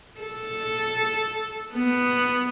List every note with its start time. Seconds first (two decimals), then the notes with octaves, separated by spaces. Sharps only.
0.20 A4
1.74 B3